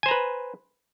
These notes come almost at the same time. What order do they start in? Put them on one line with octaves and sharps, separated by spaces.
G#5 C5 A#5 B4